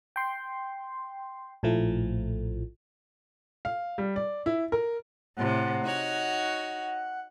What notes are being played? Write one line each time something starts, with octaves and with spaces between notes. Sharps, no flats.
G5 C6
A#1 A2 F3 A3
F5
G3
D5
E4
A#4
A2 C3 F#5
D#4 F#4 C#5